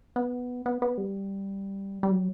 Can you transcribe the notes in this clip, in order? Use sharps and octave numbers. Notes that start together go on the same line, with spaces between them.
B3
B3
B3
G3
G3
F#3